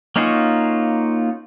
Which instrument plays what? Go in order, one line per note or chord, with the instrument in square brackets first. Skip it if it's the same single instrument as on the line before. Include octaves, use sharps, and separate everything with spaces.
[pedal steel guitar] A#3 C#4 D#4 F4 F#4